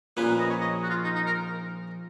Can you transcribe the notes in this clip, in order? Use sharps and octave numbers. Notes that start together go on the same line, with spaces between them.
A#1 A#2 F3 A#3 C#4 B4
B4
D#5
C#5
D#5
F#4
F4
D#4
D#4
A#4